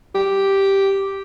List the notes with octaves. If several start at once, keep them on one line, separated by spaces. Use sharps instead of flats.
G4